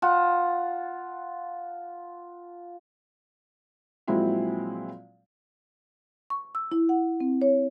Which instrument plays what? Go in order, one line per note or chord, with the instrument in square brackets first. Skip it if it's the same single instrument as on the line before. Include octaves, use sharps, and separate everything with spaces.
[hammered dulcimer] F4 F#5 A5
[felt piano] A#2 F3 F#3 G#3 C4 E4
[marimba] C#6
E6
E4
F#5
C4
C#5